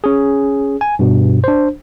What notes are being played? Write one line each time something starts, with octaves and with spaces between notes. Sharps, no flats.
C#4 G#4
G#5
G2 B2
D4 C5